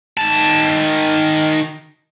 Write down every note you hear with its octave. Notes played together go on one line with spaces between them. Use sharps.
D#3 A5